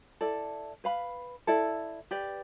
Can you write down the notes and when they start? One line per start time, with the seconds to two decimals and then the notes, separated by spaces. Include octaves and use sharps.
0.21 E4 A4 D5
0.84 B4 F5 B5
1.47 E4 A4 D5
2.11 G4 B4 D5